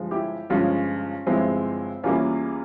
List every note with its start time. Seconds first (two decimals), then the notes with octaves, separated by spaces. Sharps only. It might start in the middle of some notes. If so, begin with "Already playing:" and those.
Already playing: G1 G2 F3 G#3
0.11 E4 G4
0.50 G1 G2 F3 G#3 C#4 F4
1.26 G1 G2 F3 G#3 C4 E4
2.03 E2 E3 G3 A#3 C#4 F4